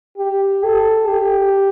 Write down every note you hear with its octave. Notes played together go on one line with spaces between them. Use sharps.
G4
A4
G4